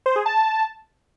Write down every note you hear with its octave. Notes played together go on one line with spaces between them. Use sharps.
C5
G#4
A5